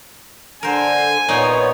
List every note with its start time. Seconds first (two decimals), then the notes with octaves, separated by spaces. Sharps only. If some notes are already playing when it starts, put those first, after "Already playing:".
0.63 D3 A#4 C5 G#5
1.28 A#2 B3 D#4 C#5